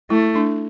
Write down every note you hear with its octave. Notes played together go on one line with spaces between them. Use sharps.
A3 E4
D4